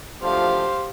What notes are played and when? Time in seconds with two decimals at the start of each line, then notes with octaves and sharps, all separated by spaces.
0.22 D2 F3 G4 C5 F5